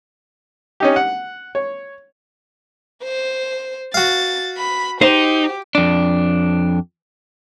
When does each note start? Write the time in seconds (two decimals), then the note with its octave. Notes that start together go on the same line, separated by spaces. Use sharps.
0.80 C#4 D#4 G4
0.96 F#5
1.55 C#5
3.03 C5
3.94 F#4 F5 A6
4.58 B5
5.01 D#4 G4 C5
5.75 F2 D4